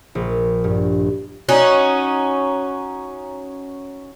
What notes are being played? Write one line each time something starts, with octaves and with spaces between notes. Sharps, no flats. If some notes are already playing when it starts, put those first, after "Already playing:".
A#1
G2
C#4 D#4 F#4